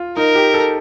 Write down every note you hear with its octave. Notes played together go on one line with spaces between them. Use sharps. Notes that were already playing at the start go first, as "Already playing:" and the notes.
Already playing: F4
D#4 A#4
G4
A4